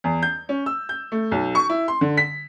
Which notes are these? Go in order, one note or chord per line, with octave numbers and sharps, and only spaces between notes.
E2
G6
C#4
E6
G6
A3
B1
C#6
E4
C6
D3
B6